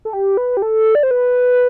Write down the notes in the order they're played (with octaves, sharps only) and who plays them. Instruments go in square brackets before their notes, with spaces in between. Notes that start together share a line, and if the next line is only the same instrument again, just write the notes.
[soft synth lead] A4
G4
B4
G4
A4
D5
C5
B4